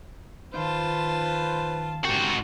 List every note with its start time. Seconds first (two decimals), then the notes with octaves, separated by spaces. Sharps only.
0.54 D#3 F3 D#4 F4 B4 C5 A5 B5
2.05 G#2 C#3 F#4 G4 A#4